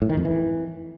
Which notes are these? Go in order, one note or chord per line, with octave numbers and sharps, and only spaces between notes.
A2
D#3
F2
E3